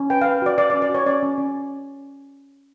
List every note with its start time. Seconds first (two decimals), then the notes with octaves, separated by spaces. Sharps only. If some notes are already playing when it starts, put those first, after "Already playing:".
Already playing: C#4
0.10 B4 G5
0.21 F5
0.26 B4
0.42 F#4 D5
0.58 B4 D5
0.70 D5
0.74 C#4
0.82 D5
0.90 F#4 C#5
1.06 C#4 D5
1.23 C#4
1.38 C#4